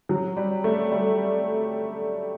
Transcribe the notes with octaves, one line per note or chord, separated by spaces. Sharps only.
F#3
G3
A3
G3